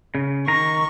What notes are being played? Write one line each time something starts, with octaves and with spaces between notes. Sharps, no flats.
C#3
D#3 A#5 C#6